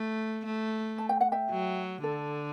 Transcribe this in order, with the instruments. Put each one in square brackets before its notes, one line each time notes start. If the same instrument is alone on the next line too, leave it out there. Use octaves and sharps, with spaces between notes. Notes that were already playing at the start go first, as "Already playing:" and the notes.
Already playing: [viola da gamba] A3
A3
[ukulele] A5
G5
F#5
E5 G5
[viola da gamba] F#3
[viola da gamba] D3 [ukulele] A4